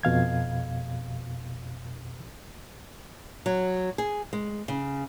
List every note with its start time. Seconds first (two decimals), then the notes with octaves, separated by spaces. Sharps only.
0.03 F2 B2 F5 G#6
3.46 F#3
3.98 G#4
4.33 G#3
4.68 C#3